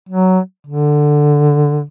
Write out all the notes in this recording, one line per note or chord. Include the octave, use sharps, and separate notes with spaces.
F#3
D3